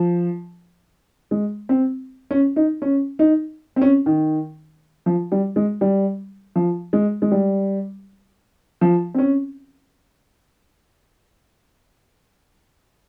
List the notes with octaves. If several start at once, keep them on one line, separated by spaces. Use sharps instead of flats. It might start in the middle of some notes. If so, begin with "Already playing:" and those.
Already playing: F3
G#3
C4
C#4
D#4
C#4
D#4
C4
C#4
D#3
F3
G3
G#3
G3
F3
G#3
G#3
G3
F3
C4
C#4